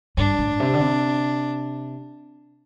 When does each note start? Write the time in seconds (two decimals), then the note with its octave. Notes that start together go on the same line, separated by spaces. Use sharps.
0.17 G2 D4
0.39 A2
0.60 C3
0.74 D3
0.80 C3